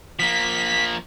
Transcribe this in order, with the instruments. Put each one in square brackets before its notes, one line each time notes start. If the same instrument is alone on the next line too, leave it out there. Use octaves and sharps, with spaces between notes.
[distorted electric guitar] F3 A#3 [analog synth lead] B6